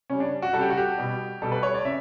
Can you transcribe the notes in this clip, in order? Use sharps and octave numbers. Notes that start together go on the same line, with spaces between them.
C#3 G3 C#4
D4
F#4
C#3 G3 G4 A4
F#4
G4
B2 G3
B2 G3 A4
B4
C#5
D5
C#3 E5